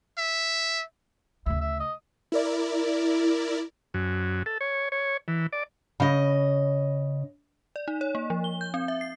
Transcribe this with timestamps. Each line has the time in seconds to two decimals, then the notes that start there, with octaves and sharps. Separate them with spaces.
0.18 E5
1.46 D2 C#3 E5
1.61 E5
1.80 D#5
2.32 E4 A#4 D5
3.94 F#2
4.46 A4
4.61 C#5
4.92 C#5
5.28 E3
5.53 D5
6.00 C#3 D#5
7.76 D5
7.88 D#4
8.01 C#5
8.15 A#3
8.30 F3
8.44 G7
8.61 G6
8.74 C4
8.88 E5
9.01 C7